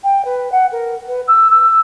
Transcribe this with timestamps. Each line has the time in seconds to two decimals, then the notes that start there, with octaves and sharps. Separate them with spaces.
0.03 G5
0.24 B4
0.51 F#5
0.71 A#4
1.07 B4
1.27 E6
1.50 E6